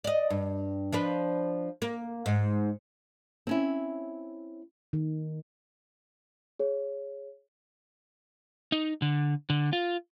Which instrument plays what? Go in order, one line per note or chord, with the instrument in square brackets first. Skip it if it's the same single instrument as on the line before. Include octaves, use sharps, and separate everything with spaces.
[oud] D5 D#5
G2
F3 D4 B4
A#3
G#2
[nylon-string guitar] C4 C#4 E4
[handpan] D#3
[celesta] G#4 C#5
[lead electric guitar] D#4
D3
D3
F4